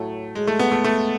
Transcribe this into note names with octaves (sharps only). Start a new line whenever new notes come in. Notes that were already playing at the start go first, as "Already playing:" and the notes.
Already playing: A2 F#3 A3
G#3
A3
B3
A3
A3